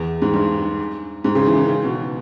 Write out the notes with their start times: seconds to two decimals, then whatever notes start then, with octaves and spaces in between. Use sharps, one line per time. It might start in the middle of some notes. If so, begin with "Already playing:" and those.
Already playing: E2
0.22 G#2
0.34 G2
1.24 G#2
1.35 C#3
1.46 E3
1.57 D#3
1.68 C#3
1.84 B2